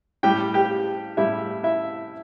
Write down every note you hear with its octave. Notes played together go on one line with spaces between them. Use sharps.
A2 G3 G4 G5
G4 G5
A2 G3 E4 E5
E4 E5